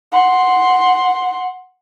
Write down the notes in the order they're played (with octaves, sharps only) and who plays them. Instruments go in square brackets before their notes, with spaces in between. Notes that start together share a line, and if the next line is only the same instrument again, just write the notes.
[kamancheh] F#5 C6